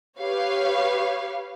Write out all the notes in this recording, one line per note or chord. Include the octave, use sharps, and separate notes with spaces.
G4 B4 C#5 F5